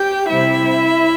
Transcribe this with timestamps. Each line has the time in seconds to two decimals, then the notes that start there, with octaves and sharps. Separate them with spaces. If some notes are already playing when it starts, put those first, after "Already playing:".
Already playing: G4 G5
0.29 C3 G3 C4 E4 E5